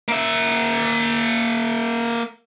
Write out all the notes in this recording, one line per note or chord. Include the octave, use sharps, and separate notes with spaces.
A#3 E5